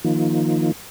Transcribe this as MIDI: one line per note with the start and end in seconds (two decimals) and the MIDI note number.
0.04 0.72 51
0.04 0.72 53
0.04 0.72 58
0.04 0.72 63
0.04 0.72 65